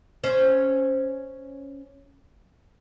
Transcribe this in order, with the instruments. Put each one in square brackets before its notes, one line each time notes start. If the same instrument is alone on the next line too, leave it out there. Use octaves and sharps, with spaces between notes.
[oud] C#4 C5